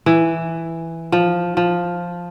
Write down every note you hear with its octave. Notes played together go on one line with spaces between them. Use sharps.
E3
F3
F3